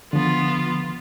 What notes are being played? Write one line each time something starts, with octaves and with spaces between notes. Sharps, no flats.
D3 F3 B3 F4